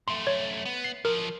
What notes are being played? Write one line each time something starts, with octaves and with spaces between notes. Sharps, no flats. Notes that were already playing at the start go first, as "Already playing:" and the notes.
F#2 A3 C6
C#5
B3
C7
F3 F#3 A#4